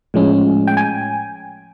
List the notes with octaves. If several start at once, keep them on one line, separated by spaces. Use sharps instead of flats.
A2 F3 G#3 C#4
G5
G#5